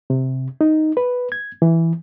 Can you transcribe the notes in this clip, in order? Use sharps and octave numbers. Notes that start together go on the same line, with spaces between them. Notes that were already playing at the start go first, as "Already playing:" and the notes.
C3
D#4
B4
G#6
E3